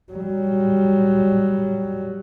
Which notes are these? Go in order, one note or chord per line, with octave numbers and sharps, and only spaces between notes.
F#3 G3